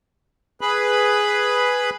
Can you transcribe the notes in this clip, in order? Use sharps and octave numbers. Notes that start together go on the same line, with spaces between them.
G#4 B4 B5